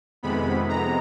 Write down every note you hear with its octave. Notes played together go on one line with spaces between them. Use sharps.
F2 C3 D#3 G#3 B3 B5
A#5